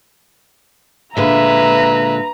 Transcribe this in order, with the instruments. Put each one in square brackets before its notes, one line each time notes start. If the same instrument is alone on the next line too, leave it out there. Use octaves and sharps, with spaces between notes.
[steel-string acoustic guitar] A#2 D3 G#3 [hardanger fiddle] B4 [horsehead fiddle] E5 [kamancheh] A#5